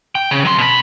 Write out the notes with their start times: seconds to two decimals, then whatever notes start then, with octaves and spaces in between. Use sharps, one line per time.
0.15 G5
0.31 C#3
0.45 F#3 C6
0.58 B2 B5